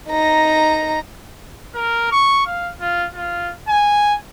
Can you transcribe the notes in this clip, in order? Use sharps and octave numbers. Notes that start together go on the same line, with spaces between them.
D#4 A#5
A#4
C#6
F5
F4
F4
G#5